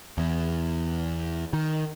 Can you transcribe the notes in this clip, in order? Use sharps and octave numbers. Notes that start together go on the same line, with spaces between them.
E2
D#3